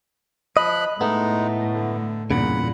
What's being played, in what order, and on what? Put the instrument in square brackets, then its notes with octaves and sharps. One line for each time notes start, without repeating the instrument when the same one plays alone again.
[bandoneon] F3 B5 F#6 [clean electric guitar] D#5
[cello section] A2 [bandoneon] G#3 D#4 [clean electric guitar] A3 B3
[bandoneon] D3
[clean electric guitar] E2 G2 C#3 [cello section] A#2 [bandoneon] F#5 B5